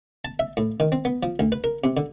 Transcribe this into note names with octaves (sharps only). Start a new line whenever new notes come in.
A5
E5
A2
D#3
C4
B3
F3
D2
B4
A#4
C3
D3